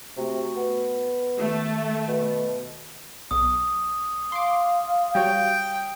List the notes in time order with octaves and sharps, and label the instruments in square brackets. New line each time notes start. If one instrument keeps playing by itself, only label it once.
[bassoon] C3 [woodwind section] A3 F#4
[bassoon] B3
[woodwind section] D#3 [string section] A3
[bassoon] B2
[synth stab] B1 [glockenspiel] D#6
[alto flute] F5 [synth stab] C6 D6
[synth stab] G3 F#4 C#5 [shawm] G5